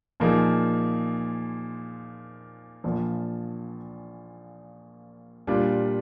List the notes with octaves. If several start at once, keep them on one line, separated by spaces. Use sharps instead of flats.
A#2 F3 A#3 D#4 G#4
A#1 A#2 F3
A#2 G3 D4 F4